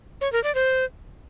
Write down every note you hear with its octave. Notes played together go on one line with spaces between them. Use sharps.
C#5
A#4
D5
C5